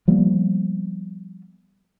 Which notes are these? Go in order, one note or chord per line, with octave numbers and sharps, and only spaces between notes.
F3 G3 A#3 B3